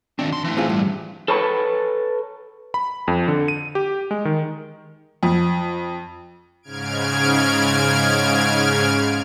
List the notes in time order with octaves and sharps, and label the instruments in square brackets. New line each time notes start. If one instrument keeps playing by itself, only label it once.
[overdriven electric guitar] D#3 C4 [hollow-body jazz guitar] D4
[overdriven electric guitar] F#2 C6
A2 E3
[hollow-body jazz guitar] C4 F4 G#4
G2
[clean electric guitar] A4 B4 C#5 A5 B5
[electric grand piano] B5
F2
D3
D#7
G4
G#3
D#3
[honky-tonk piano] F2
[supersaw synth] G#2 C#3 F6 G#6 D7